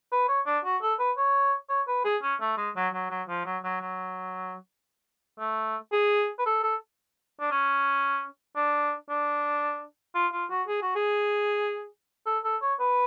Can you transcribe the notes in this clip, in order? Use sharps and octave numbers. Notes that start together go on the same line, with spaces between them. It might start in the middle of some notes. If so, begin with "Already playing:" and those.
B4
C#5
D4
F#4
A4
B4
C#5
C#5
B4
G#4
C#4
A3
G#3
F#3
F#3
F#3
F3
F#3
F#3
F#3
A3
G#4
B4
A4
A4
D4
C#4
D4
D4
F4
F4
F#4
G#4
F#4
G#4
A4
A4
C#5
B4